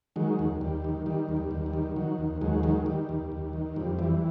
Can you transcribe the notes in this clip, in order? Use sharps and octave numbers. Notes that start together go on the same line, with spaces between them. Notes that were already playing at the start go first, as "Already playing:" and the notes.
D#3 F#3 G#3
D#2
D#2 G3
D#3
D#3 G3
D#2
G3
D#2
G3
D#3
D#3 F#3
D#2
D#2 F#3 G#3
D#3 F#3 G#3
D#3 G3
D#2
D#2
D#3
F2 G3
E3 G3